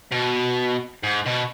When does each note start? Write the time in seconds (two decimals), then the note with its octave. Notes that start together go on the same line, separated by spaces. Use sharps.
0.12 B2
1.04 G#2
1.26 B2